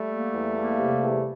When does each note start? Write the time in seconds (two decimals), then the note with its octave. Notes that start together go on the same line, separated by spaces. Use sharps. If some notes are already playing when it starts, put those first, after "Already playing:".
Already playing: G3 A3
0.11 A#3
0.34 E2
0.57 A#3
0.78 C3
1.02 E2